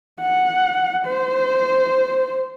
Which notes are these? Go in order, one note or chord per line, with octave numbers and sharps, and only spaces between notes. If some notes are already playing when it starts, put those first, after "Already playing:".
F#5
C5